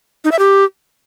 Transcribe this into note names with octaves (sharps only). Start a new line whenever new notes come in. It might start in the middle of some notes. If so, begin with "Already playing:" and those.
D#4
E5
G4